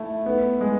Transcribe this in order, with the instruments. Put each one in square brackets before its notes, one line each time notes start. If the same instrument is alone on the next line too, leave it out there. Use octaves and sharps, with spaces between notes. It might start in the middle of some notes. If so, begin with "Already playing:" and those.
Already playing: [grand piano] A3 E4
B3
G#3